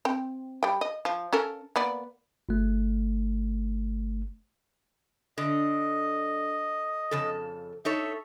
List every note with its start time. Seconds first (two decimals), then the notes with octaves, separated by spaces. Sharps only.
0.05 C4 G5
0.63 G3 G5
0.81 D#5
1.05 F3
1.33 C#4 A4 A#4
1.76 A#3 B3 D5
2.49 G1 A3
5.38 D3 D#5
7.11 F2 C#3 A4
7.85 D#4 A4 C#5 E5